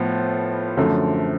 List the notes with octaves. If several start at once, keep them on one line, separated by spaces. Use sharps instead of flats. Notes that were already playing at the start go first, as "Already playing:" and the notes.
Already playing: A2 F3 B3 F4
F#2 D3 F3 A3